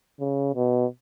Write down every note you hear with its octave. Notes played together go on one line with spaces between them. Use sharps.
C#3
B2